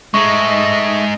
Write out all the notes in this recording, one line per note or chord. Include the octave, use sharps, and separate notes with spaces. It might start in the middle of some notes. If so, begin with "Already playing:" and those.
G#3 A3 D#4 D#5 E5 C#6